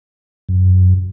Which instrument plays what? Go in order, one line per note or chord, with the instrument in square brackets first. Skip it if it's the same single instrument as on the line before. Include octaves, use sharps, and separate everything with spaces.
[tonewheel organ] F#2